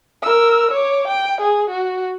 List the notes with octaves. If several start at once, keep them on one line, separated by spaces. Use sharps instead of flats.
A#4 E6
C#5 D6
G5
G#4
F#4